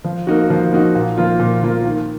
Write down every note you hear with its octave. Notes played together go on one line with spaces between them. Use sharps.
F3
A#3 D#4 F#4
F3
A#3 D#4 F#4
A#2
F3 A#3 F4
A#2
F3 A#3 F4
D#3